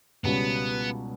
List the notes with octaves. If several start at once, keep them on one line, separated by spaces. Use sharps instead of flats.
C#2 B2 G3 B3 C#4